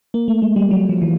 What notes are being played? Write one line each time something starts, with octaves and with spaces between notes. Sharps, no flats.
A#3
A3
G#3
G3
F#3
F3
E3